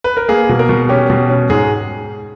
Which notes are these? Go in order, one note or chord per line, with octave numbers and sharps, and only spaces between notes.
B4
A#4
A#3 G#4
B2
A#4
B2
C#4 G4
B2
C#4
G#2 G#4